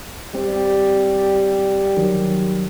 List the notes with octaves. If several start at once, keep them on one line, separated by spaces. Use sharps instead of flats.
G3 C4
D#3 F#3